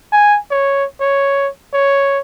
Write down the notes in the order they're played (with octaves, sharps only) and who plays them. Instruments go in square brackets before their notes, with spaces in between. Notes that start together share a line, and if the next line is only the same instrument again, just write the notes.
[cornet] G#5
C#5
C#5
C#5